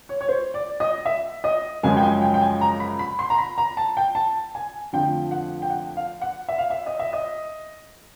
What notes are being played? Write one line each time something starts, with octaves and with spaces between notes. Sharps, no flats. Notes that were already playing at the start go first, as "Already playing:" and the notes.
C#5
C#5
C5
D5
D#5
E5
D#5
F#2 C#3 F3 G#3 G#5
G5
G#5
G5
G5
G#5
A#5
B5
B5
C6
A#5
B5
A#5
A5
G5
A5
G#5
F2 D3 F3 A3 G5
F#5
G5
F#5
F5
F#5
E5
F5
E5
D#5
E5
D#5